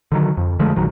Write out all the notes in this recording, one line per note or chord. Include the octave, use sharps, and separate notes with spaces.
D3 D#3 F#3
F2
D3 F3 G#3 A3
A#1 D#3 F#3